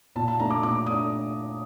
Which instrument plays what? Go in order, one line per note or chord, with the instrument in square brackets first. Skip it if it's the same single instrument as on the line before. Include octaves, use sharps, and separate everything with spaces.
[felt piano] A#2 A5
A5
A3 D4 A#5
D6
A#2 D6
A3 D4 D#6